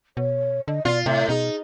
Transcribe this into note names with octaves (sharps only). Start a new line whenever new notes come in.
B2 C#5
D3 D#5
B2 F4 D5
A2 C3 E5
B2 D#4 G#4